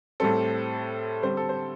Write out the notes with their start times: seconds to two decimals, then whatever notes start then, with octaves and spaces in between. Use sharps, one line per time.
0.20 A2 G3 C4 A4
1.23 D3 G3 C4 C5
1.37 A4
1.49 C5